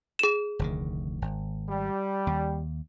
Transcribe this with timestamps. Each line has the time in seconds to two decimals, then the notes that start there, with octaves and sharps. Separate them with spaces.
0.19 G#4 E7
0.59 F1 D2 D#3
1.22 G#1
1.70 G3
2.27 D#2